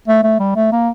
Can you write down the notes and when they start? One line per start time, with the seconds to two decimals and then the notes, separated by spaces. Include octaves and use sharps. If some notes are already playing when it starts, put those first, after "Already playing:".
0.08 A3
0.23 A3
0.40 G3
0.56 A3
0.72 A#3